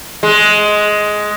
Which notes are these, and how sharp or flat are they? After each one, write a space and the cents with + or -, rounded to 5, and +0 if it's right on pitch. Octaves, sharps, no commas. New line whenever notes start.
G#3 +10